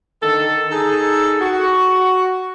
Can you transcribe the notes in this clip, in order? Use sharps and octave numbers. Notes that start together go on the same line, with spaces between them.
D3 D#3 A4
D#4 G#4 A4
F#4